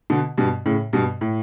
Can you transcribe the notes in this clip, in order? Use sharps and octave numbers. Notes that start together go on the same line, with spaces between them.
B2 D3
G2 B2
A2 C#3
G2 B2
A2